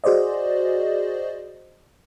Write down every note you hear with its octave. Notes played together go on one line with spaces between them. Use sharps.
F#4 G#4 C5 D5 D#5